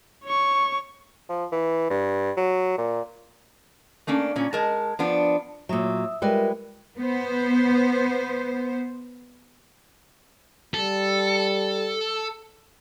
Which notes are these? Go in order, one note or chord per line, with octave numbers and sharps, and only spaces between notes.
C#5 C#6
F3
E3
G2
F#3
A#2
A3 A#3 C#4 D4
A#2 C#4
G#3 A#4 A5
F3 B3 D4
A#2 F#3 E5 D#6 E6
G3 G#3 F4 A#4 B4 E5
B3 C5
G3 A4